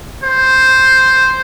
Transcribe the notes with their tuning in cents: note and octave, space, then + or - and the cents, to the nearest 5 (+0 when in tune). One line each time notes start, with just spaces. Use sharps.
C5 +0